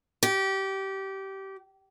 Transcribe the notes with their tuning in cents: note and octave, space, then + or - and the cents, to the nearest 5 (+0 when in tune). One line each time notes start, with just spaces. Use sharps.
G4 -20